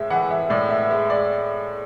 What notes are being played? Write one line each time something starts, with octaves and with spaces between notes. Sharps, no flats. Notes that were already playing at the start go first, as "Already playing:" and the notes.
Already playing: A2 G#3 E5
E3 F#5
E5
A2 D5
E5
G#3 E5
D5